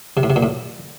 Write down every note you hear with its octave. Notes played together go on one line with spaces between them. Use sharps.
C3
A2
C3
A#2
A2